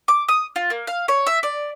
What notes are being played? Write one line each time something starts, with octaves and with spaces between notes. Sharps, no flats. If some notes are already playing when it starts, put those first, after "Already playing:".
D6
D#6
F4
A#3
F5
C#5
E5
D5